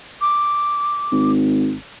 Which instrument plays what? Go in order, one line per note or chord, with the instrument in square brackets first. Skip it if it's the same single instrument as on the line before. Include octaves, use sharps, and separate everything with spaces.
[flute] D6
[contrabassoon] G#1